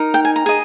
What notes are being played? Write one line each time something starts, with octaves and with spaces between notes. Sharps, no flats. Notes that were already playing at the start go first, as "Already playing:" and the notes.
Already playing: D#4 A#4
G5
G#5
A#5
G#4 D#5